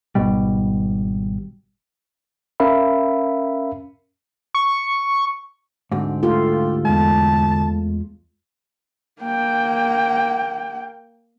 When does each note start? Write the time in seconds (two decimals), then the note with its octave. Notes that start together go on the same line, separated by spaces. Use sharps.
0.15 G#1 B2 G3
2.60 C#4 A#4 E5 F5 B5
4.54 C#6
5.91 D2 G#2 C4
6.23 A3 F4 G4 A4
6.85 E2 G#3 A5
9.22 A#3 G5